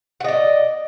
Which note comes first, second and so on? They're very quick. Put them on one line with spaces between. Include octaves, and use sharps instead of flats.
F#5 D#5 D5